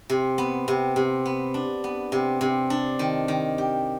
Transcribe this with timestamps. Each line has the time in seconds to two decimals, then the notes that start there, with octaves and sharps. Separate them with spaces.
0.10 C3
0.38 B3
0.68 C3
0.96 C3
1.26 B3
1.54 D4
1.84 B3
2.12 C3
2.41 C3
2.70 D4
2.99 D#3
3.28 D#3
3.58 G4